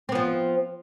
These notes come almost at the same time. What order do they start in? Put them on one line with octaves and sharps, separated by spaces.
C4 B3 F3